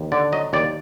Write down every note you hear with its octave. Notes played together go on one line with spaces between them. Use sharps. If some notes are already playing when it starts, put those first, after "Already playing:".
Already playing: D#2
D3 D5
F#3 D#5
D#2 D5